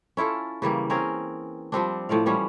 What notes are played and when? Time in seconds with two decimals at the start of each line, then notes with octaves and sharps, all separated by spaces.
0.17 C#4 E4 F4 A4
0.62 C#3 E3 G3 A#3
0.90 C4 C#4 G#4 A#4
1.72 F3 G3 C4 D4
2.09 A2 F3 D5 F5
2.26 E3 F3 G3 C#4